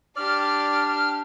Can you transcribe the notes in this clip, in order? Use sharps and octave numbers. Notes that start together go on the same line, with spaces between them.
D4 G4 D5 F6